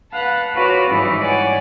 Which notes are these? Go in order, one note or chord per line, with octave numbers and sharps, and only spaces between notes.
B4 F5 F#5 A5 B5
F4 F#4 A#4 B4 C#5 D5
G#2 E3 G3 D#4 E4
C#5 D5 F#5 G#5 D6